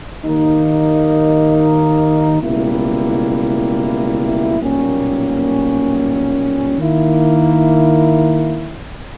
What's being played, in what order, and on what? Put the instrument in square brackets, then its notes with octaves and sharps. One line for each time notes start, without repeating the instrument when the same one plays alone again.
[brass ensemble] D#2 D#3 A#3 D#4
C#2 B2 G3 A#3 E4
B1 A#2 G3 A#3 C#4
D#3 A#3 E4